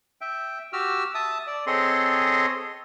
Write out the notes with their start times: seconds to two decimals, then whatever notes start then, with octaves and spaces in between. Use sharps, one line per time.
0.21 E5 G5
0.73 F#4 G4 E6 F6
1.15 E5 A5 D#6
1.47 D5
1.67 C4 G#4 A4 C#5 D#5 C6